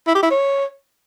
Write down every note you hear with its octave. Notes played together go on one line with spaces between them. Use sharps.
E4
G4
E4
C#5